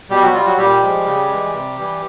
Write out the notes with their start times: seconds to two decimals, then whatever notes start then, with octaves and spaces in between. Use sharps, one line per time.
0.10 B2 G3 G4
0.22 F#3 F#4
0.34 G3 F4
0.46 F#3 F#4
0.57 A#2 G3 G4
0.82 F3 G#3
1.06 C#3
1.30 E3 G#3
1.53 C3
1.78 E3 G3